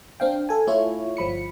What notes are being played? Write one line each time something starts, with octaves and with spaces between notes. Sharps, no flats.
C4 D4 F5 G5
A4 G#5
A3 E4 F4 C#5
G1 F3 B5 C#7